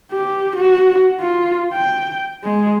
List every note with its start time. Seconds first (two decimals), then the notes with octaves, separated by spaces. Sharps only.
0.12 G4
0.56 F#4
1.20 F4
1.73 G5
2.44 G#3